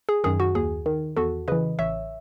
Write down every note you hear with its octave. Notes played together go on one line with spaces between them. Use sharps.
G#4
F#2 D#3 G#4
F#4
D#2 G#4
D#3
E2 F#4 A4
C#3 E3 B4 D#5
A1 C#5 E5